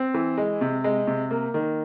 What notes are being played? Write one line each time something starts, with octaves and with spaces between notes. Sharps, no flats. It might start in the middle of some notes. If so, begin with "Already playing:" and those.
Already playing: C4
E3
G#3
C3
G#3
C3
A#3
D#3